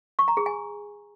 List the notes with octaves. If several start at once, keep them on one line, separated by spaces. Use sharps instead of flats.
C#6
A#5
G#4
G#5